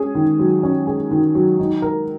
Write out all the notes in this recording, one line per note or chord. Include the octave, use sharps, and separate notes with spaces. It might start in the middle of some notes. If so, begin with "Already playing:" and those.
Already playing: C#4 G#4
D#3
F#3
C#4
G#4
D#3
F#3
D#4
A#4